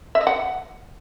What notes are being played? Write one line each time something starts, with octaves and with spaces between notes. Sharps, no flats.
E5
D#5
F#5